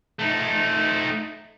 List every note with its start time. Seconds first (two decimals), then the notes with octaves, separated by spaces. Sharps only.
0.19 A3 D#4